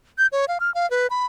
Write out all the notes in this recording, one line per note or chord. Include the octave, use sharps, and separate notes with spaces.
G6
C#5
F5
F6
F5
B4
B5